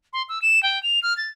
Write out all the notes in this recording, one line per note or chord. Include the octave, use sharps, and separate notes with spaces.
C6
E6
E7
G5
F7
F6
A6